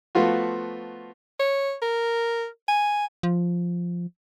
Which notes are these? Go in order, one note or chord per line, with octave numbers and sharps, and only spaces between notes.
F3 A3 B3 F4 F#4
C#5
A#4
G#5
F3